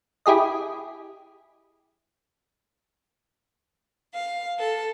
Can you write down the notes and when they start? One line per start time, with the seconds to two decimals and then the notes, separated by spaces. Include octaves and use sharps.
0.26 E4 G4 G#4 D#5
4.14 F5
4.59 A4